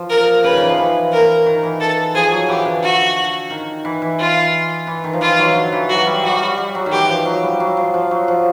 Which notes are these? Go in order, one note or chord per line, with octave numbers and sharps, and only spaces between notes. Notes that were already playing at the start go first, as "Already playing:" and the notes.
Already playing: F3
A#4
C#3 B4
D#3
E3
F3
E3
A#4
D#3
E3
A4
F3 G#4
F#3
E3 G4
D3
F#4
D#3
E3
E3
F4
E3
D#3
F3
E3 F4
F#3
D3
E3
F#3 F#4
G3
F#3 F#4
G3
G3
F#3
D#3
E3 G4
F3
F#3
G3
F#3
F3
F3
F#3
F3